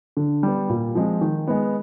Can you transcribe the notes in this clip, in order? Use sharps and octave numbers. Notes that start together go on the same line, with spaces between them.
D3
G3 B3
A#2
F3 G#3 C4
D#3
G#3 B3